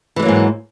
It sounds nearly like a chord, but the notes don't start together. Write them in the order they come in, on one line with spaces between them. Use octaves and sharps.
E3 G#3 F#3 A#3 G#2